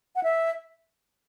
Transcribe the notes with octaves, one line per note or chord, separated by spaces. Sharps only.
F#5
E5